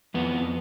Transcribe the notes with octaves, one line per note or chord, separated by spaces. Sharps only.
F2 B3
F2